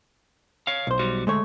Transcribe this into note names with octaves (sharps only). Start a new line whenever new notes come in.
C#5 F5
B1 C5
G3 F#4
D2 G#3 A3 C#5